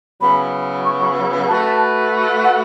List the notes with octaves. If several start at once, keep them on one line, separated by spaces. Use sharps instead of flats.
C#3 F#3 B3 E4 B5
C#6
A3 F#4 B4 A5
F#5